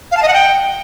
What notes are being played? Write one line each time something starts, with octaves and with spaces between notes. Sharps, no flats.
F5
A5
D#5
F#5
G5